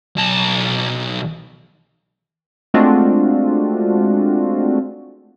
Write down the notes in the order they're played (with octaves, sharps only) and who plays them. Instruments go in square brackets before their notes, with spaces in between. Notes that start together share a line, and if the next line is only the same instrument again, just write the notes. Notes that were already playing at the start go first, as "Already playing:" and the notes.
[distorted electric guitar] B1 A5
[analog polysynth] G#3 A3 C4 D4 F4 F#4